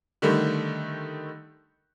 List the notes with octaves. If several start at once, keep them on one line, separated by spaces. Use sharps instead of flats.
D3 D#3 G3 A3